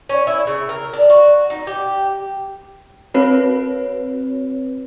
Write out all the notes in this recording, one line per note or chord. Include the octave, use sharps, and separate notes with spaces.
C#4
E4
C#3
A#4
D4
F#4
D#4
G4
C4 F#4 B4 C#5